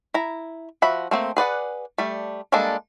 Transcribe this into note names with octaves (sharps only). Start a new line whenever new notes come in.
E4 A#5
F3 F#4 E5 B5
A3 A#3 C4
G#4 B4 D5 F#5
G3 A3
G3 G#3 A#3 D4 A4